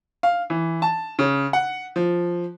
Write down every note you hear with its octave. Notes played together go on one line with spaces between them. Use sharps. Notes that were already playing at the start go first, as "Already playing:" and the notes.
F5
E3
A5
C#3
F#5
F3